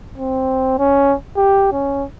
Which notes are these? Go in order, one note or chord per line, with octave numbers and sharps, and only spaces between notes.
C4
C#4
G4
C#4